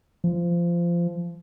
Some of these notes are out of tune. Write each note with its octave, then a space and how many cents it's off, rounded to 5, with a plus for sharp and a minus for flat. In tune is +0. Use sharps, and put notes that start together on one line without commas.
F3 -20